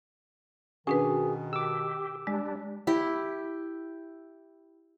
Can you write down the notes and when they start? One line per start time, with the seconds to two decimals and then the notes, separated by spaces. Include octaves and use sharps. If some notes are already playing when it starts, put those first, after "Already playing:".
0.87 B2 D#3 C#4 D4 F#4 G#4 B4
1.53 G4 D6 E6
2.27 G3 G#3 D4
2.87 E4 G4